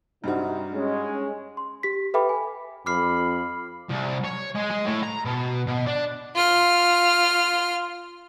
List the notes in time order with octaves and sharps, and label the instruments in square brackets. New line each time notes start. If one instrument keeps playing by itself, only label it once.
[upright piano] G2 G3 F#4 [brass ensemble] C3 D#4
[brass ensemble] G#3 C#4
[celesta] C6
G4 B6
A4 B4 E5 G5 B5 D6
G#5
[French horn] F2 [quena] B5 [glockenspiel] D6 F6 C7
[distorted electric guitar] C2
C#5
G#3
G#3
A2
A#5
B2
B2
D4
[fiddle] F4 F6